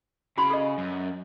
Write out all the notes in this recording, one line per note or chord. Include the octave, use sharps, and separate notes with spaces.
C#3 F#4 B5 C6
A4 D#5
F#2